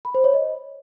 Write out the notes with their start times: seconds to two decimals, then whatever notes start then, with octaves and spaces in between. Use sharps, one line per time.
0.05 B5
0.14 C5
0.24 C#5
0.34 D#5